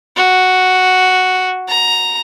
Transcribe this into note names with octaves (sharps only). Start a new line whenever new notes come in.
F#4
A#5